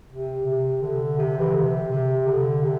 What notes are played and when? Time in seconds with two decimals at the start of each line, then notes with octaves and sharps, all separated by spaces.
0.10 C3
0.46 C3
0.82 D3
1.18 C3
1.39 E3
1.47 D3
1.55 C3
1.91 C3
2.27 D3
2.63 C3